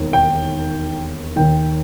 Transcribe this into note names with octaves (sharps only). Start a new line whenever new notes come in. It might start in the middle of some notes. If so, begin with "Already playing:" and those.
Already playing: E1 D#2
G5
D#2 D#3 G5